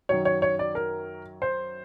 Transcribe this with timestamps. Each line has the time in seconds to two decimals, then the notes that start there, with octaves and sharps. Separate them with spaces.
0.09 F#2 D#3 F#3 C#5
0.25 C#5
0.42 C#5
0.59 D5
0.75 A#4
1.42 C5